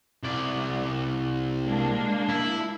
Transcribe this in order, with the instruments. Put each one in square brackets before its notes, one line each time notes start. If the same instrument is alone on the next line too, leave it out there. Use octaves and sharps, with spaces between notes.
[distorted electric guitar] C2 D5
[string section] G#3 A#3 D4
[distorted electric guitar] E4